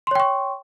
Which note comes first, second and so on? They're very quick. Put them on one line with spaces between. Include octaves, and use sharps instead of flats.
C6 C#5 G5 C#6